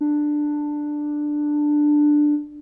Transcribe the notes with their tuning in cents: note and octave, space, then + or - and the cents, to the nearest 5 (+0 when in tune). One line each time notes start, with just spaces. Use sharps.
D4 +10